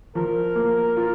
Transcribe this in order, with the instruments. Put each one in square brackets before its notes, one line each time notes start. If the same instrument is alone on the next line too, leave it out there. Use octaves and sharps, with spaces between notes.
[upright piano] F3 [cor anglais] A#4
[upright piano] A#3
F4